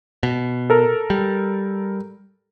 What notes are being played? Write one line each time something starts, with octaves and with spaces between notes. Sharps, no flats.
B2
A4 A#4
G3